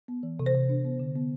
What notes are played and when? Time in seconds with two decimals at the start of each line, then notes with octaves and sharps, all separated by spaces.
0.08 B3
0.23 E3
0.40 C3
0.46 C5
0.55 C3
0.69 D4
0.85 B3
1.00 D3
1.15 B3